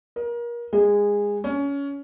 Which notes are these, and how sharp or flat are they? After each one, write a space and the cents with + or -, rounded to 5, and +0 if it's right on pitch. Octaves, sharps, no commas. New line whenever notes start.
A#4 +30
G#3 -20
C#4 +20